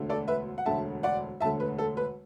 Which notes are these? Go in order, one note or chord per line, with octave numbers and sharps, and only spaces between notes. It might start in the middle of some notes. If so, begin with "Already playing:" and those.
Already playing: E1 D2 D3 A3
A4 D5
B4 E5
F#5
E1 D2 D3 A3 E5 A5
D5 F#5
E1 D2 D3 A3 E5 A5
B4
A4
B4